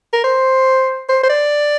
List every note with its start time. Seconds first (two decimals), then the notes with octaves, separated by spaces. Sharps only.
0.13 A#4
0.24 C5
1.09 C5
1.23 C5
1.30 D5